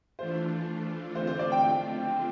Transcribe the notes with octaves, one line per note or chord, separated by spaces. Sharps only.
E3 A3 D4 F4 C5
D3 A3 C4 F4 C5
C5
D5
G5
G5